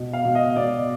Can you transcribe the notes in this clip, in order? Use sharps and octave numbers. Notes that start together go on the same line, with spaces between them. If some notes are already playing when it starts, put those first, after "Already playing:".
Already playing: B2
F5
B2
D#5
B2 D5